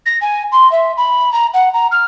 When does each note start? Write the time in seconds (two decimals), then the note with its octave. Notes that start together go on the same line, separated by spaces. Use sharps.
0.05 A#6
0.21 G#5
0.51 C6
0.71 E5
0.97 B5
1.32 A#5
1.53 F#5
1.73 A#5
1.91 F6